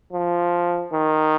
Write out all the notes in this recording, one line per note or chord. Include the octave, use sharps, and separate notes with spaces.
F3
D#3